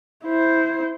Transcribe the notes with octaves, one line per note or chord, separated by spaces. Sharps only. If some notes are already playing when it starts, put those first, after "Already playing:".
E4 C5